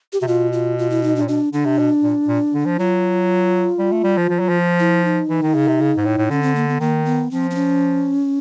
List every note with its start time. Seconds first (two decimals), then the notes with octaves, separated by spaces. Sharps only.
0.13 G4
0.21 C3 F#4
0.27 B2 F4
0.53 F4
0.78 F4
0.90 E4
1.03 D#4
1.16 D4
1.21 A#2
1.28 B2 D4
1.53 D3 D4
1.65 C3
1.79 B2
2.03 A#2
2.28 A#2
2.54 D3
2.66 F3
2.79 F#3 F4
3.79 G3
3.92 A3
4.04 G3
4.17 F3
4.29 F3
4.40 F#3
4.49 F3
4.80 E4
5.04 D#4
5.30 E3
5.42 D#3
5.55 C#3
5.68 C3
5.81 C#3
5.97 G#2
6.05 A2
6.18 A2
6.30 D3 C#4
6.42 C4
6.55 A#3
6.68 B3
6.80 D#3 A#3
7.05 B3
7.30 F3 C4
7.51 C4
7.55 C#4